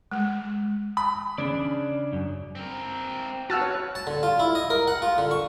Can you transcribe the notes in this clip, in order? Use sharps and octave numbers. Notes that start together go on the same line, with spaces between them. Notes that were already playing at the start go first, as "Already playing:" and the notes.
G#3
B5
C#3 D4 D5
F#2
C4 A#4
F#4 B4 F#5 A5 E6 F6
C#5
A5
D3
F4
E4
D#5
A#4
F#5
F4
D3
C#6